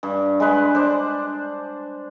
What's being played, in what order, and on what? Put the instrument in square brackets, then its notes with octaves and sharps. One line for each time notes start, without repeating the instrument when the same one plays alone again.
[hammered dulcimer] G2
G#3 B4
D4 C5